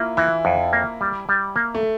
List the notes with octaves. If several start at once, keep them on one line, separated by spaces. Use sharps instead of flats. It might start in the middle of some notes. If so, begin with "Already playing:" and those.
Already playing: A#3 E4 F4
E3 E4
F2
A#3
G3
G3
A#3
A3